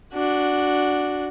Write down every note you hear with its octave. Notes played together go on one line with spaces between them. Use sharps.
D4 F#4